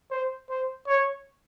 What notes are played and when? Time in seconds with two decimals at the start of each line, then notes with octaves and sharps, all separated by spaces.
0.11 C5
0.50 C5
0.87 C#5